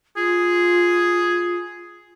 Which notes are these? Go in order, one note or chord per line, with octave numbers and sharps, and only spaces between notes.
F4 G#4